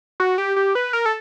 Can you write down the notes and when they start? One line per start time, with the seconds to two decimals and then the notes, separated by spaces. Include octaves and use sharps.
0.20 F#4
0.38 G4
0.56 G4
0.75 B4
0.93 A#4
1.06 A4